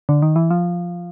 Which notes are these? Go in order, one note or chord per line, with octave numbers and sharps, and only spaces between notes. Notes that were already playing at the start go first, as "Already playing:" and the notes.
D3
D#3
E3
F3